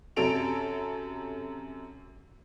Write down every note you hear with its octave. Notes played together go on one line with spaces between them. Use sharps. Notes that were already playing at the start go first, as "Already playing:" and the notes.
F#2 C3 A4 D7 F7